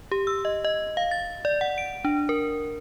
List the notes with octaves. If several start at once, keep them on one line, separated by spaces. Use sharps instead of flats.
G4
E6
D#5
D#5
F5
A6
D5
F#5
D7
D4
A#4